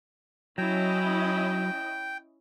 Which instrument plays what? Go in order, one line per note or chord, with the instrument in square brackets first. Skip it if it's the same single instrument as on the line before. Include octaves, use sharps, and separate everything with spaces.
[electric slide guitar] F#3 [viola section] C#4 E4 D#5 [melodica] G5